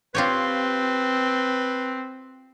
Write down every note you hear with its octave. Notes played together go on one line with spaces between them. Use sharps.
C4 F4 G4 B4 C#5